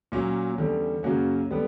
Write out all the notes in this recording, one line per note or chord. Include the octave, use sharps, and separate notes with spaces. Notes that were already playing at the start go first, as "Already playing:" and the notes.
A#2 F#3 A#3 C#4
E2 D3 G3 C#4
F#2 C#3 F#3 A#3 C#4 F#4
D3 G3 B3